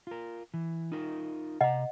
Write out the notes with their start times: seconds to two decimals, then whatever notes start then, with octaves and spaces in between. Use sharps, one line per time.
0.07 F4 A#4
0.54 E3
0.92 D#4 F4 A#4
1.61 C3 D#5 F#5 A#5